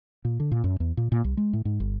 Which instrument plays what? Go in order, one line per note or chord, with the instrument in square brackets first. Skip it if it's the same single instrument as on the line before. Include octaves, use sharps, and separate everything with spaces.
[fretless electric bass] A#2
D3
A#2
F#2
E2
A#2
A#2
C2
G#3
A2
G#2
G1